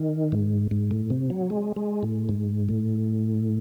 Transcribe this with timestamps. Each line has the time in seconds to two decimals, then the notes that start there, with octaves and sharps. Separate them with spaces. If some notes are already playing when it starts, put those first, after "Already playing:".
Already playing: D#3
0.32 G#2
0.71 G#2
0.91 A2
1.10 C3
1.30 F#3
1.50 G#3
1.76 G#3
2.03 A2
2.29 G#2
2.69 A2